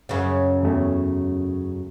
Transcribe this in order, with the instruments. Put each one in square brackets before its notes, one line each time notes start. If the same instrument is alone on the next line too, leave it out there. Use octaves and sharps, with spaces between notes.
[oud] F#2 C#3
[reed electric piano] E2 A3